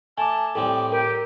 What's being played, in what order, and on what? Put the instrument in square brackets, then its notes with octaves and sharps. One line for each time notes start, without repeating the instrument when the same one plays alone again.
[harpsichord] A3 [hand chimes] G#5 D6 [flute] A5
[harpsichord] A2 G3 C4 [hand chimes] A4 [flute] D6
[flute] G4 [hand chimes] A#4